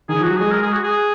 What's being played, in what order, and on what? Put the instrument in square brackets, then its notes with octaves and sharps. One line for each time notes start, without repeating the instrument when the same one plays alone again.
[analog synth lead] D#3 [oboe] G#4
[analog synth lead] F3
[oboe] F#4
[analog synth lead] F#3
[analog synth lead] G#3 [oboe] G#4
[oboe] A#4
G#4
F#4
G#4